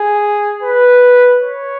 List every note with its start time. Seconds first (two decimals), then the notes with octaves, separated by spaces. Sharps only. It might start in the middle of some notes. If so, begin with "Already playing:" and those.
Already playing: G#4
0.62 B4
1.41 C#5